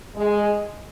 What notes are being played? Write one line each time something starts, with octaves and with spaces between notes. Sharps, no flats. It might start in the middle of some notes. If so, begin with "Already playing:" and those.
G#3